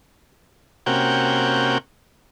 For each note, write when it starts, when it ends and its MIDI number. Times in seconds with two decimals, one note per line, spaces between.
0.86 1.78 48
0.86 1.78 58
0.86 1.78 61
0.86 1.78 66
0.86 1.78 79